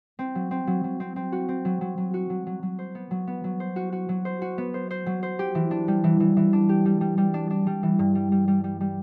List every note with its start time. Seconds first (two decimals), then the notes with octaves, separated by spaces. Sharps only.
0.19 C4
0.35 F#3
0.51 C4
0.67 F#3
0.84 F#3
1.00 C4
1.16 C4
1.32 F#4
1.48 C4
1.65 F#3
1.81 F#3
1.98 F#3
2.14 F#4
2.30 F#3
2.47 F#3
2.63 F#3
2.79 C5
2.95 B3
3.11 F#3
3.27 B3
3.44 F#3
3.60 C5
3.76 F#4
3.92 F#4
4.09 F#3
4.25 C5
4.42 F#4
4.58 B3
4.74 C5
4.91 C5
5.06 F#3
5.23 C5
5.39 G4
5.55 E3
5.71 D4
5.88 G3
6.04 E3
6.20 E3
6.37 E3
6.53 D4
6.69 G4
6.85 G3
7.01 G3
7.18 G3
7.34 D4
7.50 D4
7.67 G3
7.83 E3
7.99 G2
8.15 G3
8.32 G3
8.48 G3
8.64 G3
8.81 G3